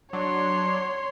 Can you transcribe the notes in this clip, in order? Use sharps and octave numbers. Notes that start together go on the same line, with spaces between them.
F#3 D4 C#5 C6